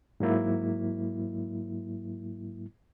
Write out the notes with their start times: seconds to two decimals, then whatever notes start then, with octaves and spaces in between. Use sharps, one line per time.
0.20 G#2 F#3 A#3 E4